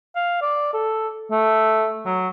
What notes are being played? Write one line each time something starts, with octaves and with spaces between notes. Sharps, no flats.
F5
D5
A4
A3
F#3